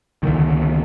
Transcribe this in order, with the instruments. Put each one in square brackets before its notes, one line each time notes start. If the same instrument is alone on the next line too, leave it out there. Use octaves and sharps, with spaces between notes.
[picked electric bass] C#2 D3 D#3